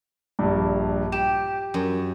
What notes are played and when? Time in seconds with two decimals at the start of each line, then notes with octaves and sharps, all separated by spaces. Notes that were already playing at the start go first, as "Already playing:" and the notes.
0.39 A#1 G2
1.12 G4 E7
1.74 F#2